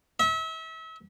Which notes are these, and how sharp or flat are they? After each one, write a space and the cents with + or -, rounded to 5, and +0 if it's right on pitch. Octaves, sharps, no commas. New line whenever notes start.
E5 -35